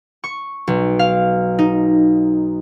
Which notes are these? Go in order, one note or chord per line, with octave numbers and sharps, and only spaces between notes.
C#6
B1
F5
D#4